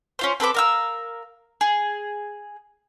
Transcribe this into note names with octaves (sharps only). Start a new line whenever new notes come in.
C#4 F4 C5
C4 A4 B4 D6
A#4 F5 E6
G#4